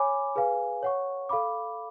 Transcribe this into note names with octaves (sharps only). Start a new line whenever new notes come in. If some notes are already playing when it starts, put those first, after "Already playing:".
Already playing: C#5 G#5 B5 D6
G#4 B4 F5 G#5
C#5 F#5 C#6
A4 F5 B5 D6